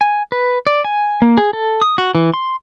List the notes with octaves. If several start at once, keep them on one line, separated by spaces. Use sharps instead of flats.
G#5
B4
D5
G#5
A#3
G#4
A4
D#6
F#4
E3
C6